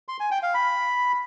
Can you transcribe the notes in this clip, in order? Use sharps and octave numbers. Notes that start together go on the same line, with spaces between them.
C6
G#5
G5
F5
B5